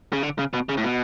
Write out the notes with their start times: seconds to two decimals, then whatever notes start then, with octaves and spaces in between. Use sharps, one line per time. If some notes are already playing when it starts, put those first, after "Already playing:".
0.13 C#3
0.23 D3
0.38 C#3
0.54 B2
0.69 C#3
0.77 A2
0.84 B2